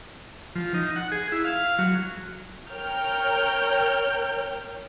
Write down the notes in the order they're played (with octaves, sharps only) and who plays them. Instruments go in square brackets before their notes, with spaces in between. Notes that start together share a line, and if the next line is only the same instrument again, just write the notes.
[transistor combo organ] F3
D#4
F#5
G#4
E4
F5
F#3
[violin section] A#4 C#5 G5 F6 G6